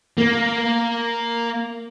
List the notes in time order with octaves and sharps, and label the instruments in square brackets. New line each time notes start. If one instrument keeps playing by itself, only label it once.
[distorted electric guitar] A#3